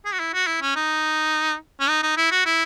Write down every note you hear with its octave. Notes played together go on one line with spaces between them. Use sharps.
G#4
F#4
E4
F#4
E4
C#4
D#4
C#4
D#4
D#4
E4
F#4
E4